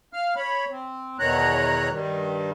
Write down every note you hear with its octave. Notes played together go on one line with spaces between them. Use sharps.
F5 F6
C#5 B5
C4
E2 B2 D#3 C#5 A#5 F#6
G2 D#3 G3